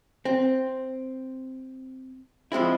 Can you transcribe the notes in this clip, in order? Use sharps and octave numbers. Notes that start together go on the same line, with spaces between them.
C4
F3 G#3 C4 E4